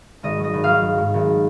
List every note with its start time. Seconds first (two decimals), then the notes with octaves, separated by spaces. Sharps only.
0.23 G#1 D#5
0.38 F#3
0.44 D#5
0.53 G#1
0.64 F#3 F5
0.83 G#2
0.98 G#2
1.14 G#1